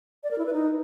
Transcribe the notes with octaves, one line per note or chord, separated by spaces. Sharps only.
D5
A#4
E4
B4
D#4